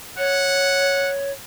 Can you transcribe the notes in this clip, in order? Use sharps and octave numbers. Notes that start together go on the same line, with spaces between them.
C#5 F#5